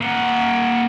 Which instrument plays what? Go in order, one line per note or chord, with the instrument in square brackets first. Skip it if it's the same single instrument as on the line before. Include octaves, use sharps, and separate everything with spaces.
[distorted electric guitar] A#3 F#5